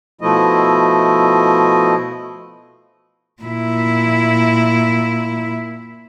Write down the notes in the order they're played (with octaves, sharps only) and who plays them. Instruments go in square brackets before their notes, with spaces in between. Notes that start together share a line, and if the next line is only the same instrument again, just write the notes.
[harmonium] B2 F3 A3 E4 D#5
[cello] A#2 E4